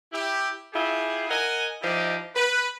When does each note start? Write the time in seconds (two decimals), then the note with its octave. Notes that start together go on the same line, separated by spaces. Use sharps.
0.13 E4 G4
0.73 E4 F4 G4 G#4
1.29 A#4 D#5 F#5 G#5
1.82 F3 D#4 E4 G4 D5 D#5
2.35 B4